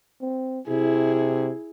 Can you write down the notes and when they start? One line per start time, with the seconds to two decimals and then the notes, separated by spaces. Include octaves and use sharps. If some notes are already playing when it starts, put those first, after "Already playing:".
0.22 C4
0.68 C3 E4 G#4